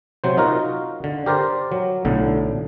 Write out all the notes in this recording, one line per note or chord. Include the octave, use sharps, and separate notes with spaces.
C3 F#3 C5
D#4 F4 F#4 A#4
D3
G4 A#4 C5 D5
F#3
B1 A2 D3